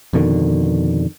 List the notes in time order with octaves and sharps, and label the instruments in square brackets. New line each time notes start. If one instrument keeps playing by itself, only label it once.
[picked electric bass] F2 B2 D3 D#3